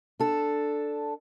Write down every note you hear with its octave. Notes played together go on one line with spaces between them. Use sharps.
D4 A4